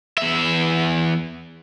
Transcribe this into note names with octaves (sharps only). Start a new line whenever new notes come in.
E2 E5